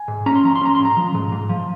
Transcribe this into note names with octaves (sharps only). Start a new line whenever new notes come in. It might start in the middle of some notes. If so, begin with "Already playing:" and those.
Already playing: G#5
G#2
C#4 A#5
C6
F3 A#5
C6
C#4 A#5
C6
G#2
A#5
F3
G#2
G#2
F3